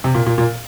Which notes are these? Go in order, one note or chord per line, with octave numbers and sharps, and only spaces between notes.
C3
A#2
A#2
A#2